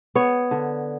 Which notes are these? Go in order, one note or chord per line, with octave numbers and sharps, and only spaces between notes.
B3 C#5
D3